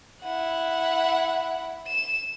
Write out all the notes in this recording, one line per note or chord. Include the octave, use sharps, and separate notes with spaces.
E4 F#5
E7